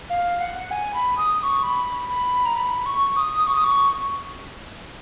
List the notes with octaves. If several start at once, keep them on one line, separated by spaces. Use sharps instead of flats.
F5
F#5
G#5
B5
D#6
D#6
C#6
B5
B5
A#5
B5
C#6
D#6
C#6
D#6
C#6